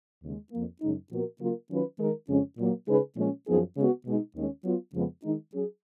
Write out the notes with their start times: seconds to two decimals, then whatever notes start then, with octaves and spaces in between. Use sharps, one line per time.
0.23 D#2 C#3 G#3
0.52 F2 F3 A#3
0.82 F#2 C#3 G#3 D#4
1.11 A#2 F3 B3 F#4 A#4
1.40 C#3 F#3 A#3 F4 A#4
1.70 D#3 F#3 C#4 F4 B4
2.00 D#3 G#3 D#4 A#4
2.29 F2 C#3 G#3 C#4
2.58 A#2 F#3 A#3
2.88 C#3 G#3 D#4 G#4 B4
3.17 A#2 F3 G#3 C#4
3.47 F#2 F3 B3 D#4 G#4
3.76 C#3 G#3 B3 F#4
4.06 B2 G#3 D#4
4.36 D#2 D#3 G#3 C#4
4.65 F#3 B3 F4
4.95 F2 C#3 F3 G#3 B3
5.24 D#3 G#3 D#4
5.54 F#3 C#4 G#4